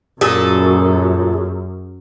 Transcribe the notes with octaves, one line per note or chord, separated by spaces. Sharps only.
F#2 A#2 G#4 A4